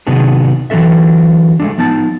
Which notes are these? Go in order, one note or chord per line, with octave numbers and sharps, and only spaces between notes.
C3 D#3 F#3 B3 D4 G#4
D3 E3 F#3 D4 A4 E5
G#3 A3 D4
F3 B3 D#4 A5